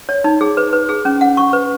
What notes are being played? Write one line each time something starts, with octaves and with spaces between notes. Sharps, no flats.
C#5
D#4
G#4
B4
B4
G#4
C#4
F#5
C#6
B4